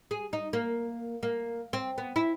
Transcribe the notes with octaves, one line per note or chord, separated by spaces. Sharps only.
G#4
D#4
A#3
A#3
C4
B3
E4